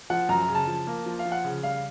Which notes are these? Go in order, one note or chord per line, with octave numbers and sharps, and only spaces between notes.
F3 F#5
F#2 A#5
A#5
C#3
A5
F3
A#3
F3
F5
F3
F#5
C#3
G3 F5